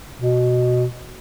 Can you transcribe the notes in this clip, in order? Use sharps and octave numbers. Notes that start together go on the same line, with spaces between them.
B2